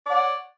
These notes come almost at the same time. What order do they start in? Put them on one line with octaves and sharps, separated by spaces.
D5 F#5 C#5